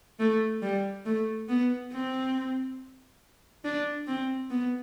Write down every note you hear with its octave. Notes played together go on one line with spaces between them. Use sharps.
A3
G3
A3
B3
C4
D4
C4
B3